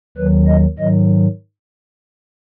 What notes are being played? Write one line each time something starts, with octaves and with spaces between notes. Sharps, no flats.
D#2 D#3 F#3 B4
D#5
G#2 D#3 F#3 D#5